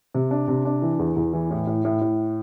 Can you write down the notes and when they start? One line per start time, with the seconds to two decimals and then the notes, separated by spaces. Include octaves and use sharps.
0.15 C3
0.31 D4
0.48 C3
0.65 D4
0.82 E3
0.99 E2
1.16 E2
1.33 E3
1.51 A2
1.67 A2
1.85 A2
2.01 A2